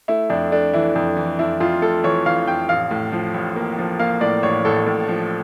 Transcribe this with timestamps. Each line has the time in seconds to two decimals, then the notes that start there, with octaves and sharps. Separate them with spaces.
0.08 A3 E4
0.30 F2 D4
0.52 A3 D4
0.74 E3 E4
0.95 F2
1.17 E3
1.39 F2 E4
1.60 F2 F4
1.82 A3 A4
2.04 E3 C#5
2.26 E3 F5
2.48 F2 G5
2.69 A1 F5
2.91 A2
3.12 F3
3.34 A1
3.56 A#3
3.78 F3
3.99 A#3 F5
4.21 A2 D5
4.43 A1 C#5
4.65 A1 A4
4.86 A2
5.08 F3